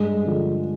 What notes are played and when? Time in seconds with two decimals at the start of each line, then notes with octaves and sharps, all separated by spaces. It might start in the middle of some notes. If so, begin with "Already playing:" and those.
Already playing: G2 G#3
0.25 D3 F3